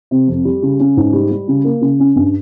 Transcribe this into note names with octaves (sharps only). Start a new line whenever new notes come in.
C3
F2
G3
C#3
C#4
G#2
G3
G3
C#3
A#3
C#3
C#4
G2